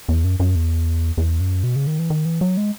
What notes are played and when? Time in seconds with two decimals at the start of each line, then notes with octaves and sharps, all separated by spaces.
0.09 E2
0.24 F#2
0.40 F#2
0.56 E2
1.17 E2
1.40 F#2
1.63 B2
1.76 C#3
1.87 D#3
1.99 E3
2.10 D#3
2.25 E3
2.41 F#3
2.57 G#3